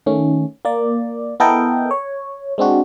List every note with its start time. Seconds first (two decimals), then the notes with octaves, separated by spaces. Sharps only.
0.06 D#3 A3 C#4
0.65 A#3 D5
1.40 B3 E4 A4 A#4 D#5 G5
1.91 C#5
2.58 G#3 C4 D4 F#4